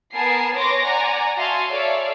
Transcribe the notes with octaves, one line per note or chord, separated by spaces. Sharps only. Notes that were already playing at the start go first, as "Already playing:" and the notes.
B3 A#4 G#5 A5 C7
B4 C#5 C6 D6 A#6
D5 F#5 G#5 A#5
F#4 E5 F5 G#5 A5 C6
A4 C#5 D5 E5 F5